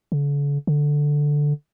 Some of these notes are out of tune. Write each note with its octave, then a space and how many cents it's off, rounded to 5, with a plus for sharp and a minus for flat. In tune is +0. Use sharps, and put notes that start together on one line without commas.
D3 -45
D3 +0